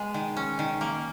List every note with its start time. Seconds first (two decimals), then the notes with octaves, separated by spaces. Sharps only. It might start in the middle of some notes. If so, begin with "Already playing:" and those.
Already playing: G#3 B3
0.14 D#3
0.36 C#4
0.59 D#3
0.81 A#3